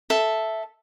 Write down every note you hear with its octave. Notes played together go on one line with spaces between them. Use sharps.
A4 E5